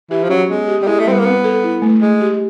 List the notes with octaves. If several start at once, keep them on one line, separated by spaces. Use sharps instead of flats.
E3 G4
F3
F#3 C#4
G#3 B3
G4
G3
G#3 E4
A3
G3 C4
B3
A#3
B3 C4
A4
E4
A3
G#3 A3
G4